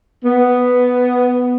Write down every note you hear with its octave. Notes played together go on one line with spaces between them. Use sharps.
B3